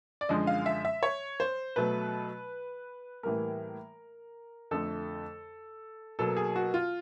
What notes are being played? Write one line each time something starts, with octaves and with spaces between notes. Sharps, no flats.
D5
F#2 D3 F3 G#3 D#5
F5
E5
E5
C#5
C5
B2 F#3 A3 B4
A2 E3 G3 A#3 A#4
F2 D3 F3 A3 A4
B2 F#3 A#3 A4
G#4
F#4
F4